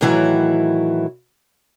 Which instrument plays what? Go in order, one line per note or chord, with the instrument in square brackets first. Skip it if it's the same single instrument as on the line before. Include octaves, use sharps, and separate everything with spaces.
[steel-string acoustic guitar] A2 D#3 E3 F#3 E4